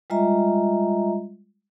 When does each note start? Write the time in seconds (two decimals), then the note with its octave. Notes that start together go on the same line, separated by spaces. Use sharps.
0.10 G3 G#3 F4 D#5 E5 A#5